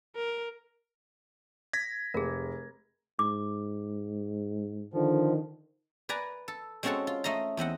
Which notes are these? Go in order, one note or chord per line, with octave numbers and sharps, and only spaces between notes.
A#4
G#6 A#6 B6
F1 G#4 A#4
G#2 D6
D3 D#3 F3
B4 D5 G#5 A#5
A4
G#3 C4 C#4 F#4 A4 C#5
F4
A3 D#5 F5 A#5
E2 C4 D#5 F#5